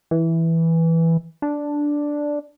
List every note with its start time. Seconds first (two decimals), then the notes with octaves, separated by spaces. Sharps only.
0.11 E3
1.42 D4